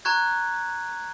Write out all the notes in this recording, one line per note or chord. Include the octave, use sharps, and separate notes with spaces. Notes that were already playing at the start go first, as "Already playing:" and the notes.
A#5 C#6 F#6 G#6